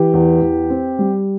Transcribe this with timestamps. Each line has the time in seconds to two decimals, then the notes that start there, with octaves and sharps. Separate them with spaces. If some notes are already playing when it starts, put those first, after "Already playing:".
Already playing: E3 G4
0.13 E2
0.42 E2
0.70 C4
0.99 G3